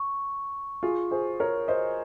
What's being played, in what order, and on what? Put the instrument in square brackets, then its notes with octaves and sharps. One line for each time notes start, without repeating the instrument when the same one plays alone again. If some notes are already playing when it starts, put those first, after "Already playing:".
Already playing: [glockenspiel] C#6
[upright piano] F4 G#4
G#4 C5
A#4 C#5
C5 D#5